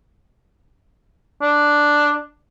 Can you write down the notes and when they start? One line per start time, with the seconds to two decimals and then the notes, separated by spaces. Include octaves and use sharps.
1.42 D4